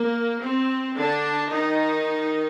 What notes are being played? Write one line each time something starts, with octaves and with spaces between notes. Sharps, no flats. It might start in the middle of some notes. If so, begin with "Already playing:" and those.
Already playing: A#3
C4
D3 D4
D#3 D#4